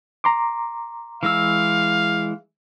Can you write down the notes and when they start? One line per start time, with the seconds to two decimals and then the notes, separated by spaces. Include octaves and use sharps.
0.24 A#5 C6 D6
1.23 E3 G#3 F5 E6